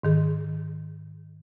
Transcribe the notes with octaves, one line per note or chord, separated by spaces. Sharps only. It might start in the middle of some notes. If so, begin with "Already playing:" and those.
G#2 D#3 G#4